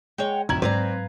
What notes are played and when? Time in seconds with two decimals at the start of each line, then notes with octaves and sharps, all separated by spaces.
0.18 G#3 C#5 F#5 G5
0.49 D1 F2 D#3 A#3 E4 A#5 G#6 F#7
0.62 G#2 F#3 C4 B4 D5 F5 A#5